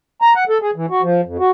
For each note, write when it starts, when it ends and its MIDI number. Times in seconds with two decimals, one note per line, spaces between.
0.22 0.33 82
0.36 0.44 78
0.49 0.58 69
0.62 0.71 68
0.76 0.86 52
0.90 1.02 66
1.02 1.21 53
1.25 1.37 41
1.39 1.51 66